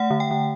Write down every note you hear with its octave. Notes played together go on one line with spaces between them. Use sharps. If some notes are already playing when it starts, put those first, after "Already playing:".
Already playing: A3 F#5
D3
G5
D3